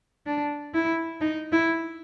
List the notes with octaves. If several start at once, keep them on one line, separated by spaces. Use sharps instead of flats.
D4
E4
D#4
E4